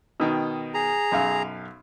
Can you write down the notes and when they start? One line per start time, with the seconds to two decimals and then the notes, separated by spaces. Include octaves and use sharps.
0.20 B2 D#3 G5
0.74 G#4 A#5
1.12 B1 F#2 F5